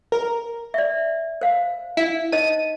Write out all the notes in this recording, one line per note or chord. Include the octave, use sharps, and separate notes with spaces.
A#4
D5 E5
C5 F5
E4
D#4 C5 D#5 D#7